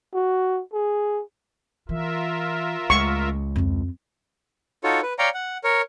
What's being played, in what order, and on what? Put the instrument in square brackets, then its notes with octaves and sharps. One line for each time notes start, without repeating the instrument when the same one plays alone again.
[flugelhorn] F#4
G#4
[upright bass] E3 [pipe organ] F4 A#4 E5
[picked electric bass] C#2 G#3 [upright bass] A3 [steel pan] C#6
[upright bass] F2 F4
[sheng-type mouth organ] D#4 F4 F#4 A4 C#5
B4
C#5 D5 F5 G5 A#5
F#5
A#4 C#5